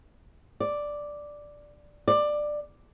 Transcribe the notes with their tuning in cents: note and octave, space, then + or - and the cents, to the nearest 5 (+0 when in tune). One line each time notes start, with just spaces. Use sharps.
D5 +0
D5 +15